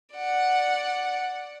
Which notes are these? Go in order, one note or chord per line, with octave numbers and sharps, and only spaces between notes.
D5 F#5